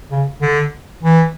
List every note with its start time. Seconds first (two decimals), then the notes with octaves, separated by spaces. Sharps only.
0.12 C#3
0.42 D3
1.03 E3